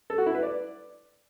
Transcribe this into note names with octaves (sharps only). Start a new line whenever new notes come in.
A4
F#4
E4
B4
D5